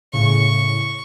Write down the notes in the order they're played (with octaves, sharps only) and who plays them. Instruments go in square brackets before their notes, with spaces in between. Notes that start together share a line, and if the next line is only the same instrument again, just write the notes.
[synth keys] A2 C#3 [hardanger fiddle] C#6